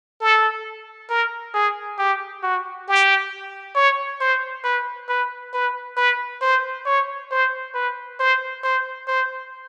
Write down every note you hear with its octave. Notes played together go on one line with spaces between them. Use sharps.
A4
A#4
G#4
G4
F#4
G4
C#5
C5
B4
B4
B4
B4
C5
C#5
C5
B4
C5
C5
C5